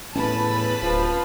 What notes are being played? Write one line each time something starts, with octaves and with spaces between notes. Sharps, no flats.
E2 A2 C#4 B4 A5 B5
D1 F3